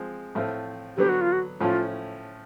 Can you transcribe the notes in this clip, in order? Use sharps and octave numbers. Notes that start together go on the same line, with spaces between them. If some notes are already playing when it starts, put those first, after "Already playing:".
Already playing: F3 G#3 C4
A2 F3 A3 C4 F4
D3 F#3 B3 G4
F#4
F4
F#4
A2 F3 A3 C#4 F4